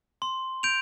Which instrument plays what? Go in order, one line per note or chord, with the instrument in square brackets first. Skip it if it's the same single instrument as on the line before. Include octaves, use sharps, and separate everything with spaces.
[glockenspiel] C6
G6 D7 F7